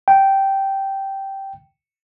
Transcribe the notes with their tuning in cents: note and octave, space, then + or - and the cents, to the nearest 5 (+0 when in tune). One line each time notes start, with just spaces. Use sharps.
G5 -10